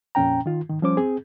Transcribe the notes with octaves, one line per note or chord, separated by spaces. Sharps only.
F2 A#2 C#4 G5 A#5
D#3 F4
G#2 D#3
F3 G3 C#4 C5 D6
C4 G#4